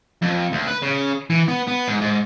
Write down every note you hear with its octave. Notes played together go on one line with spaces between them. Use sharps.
F2
D2
B4
C#3
E3
B3
B3
G#2
G#2